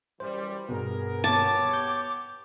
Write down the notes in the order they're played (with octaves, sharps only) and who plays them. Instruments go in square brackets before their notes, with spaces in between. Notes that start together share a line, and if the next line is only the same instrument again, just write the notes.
[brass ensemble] F#2 E3 G3 [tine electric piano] C5
[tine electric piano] G2 B2 [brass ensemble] B3 G#4 A#4
[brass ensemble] B3 G4 C#5 [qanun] A5 [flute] D6
[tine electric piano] G6